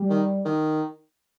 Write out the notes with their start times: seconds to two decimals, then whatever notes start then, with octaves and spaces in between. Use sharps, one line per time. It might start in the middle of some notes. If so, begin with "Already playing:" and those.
Already playing: G3
0.10 D#3
0.45 D#3